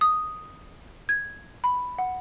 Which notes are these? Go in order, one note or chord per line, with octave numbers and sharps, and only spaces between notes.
D#6
G#6
B5
F#5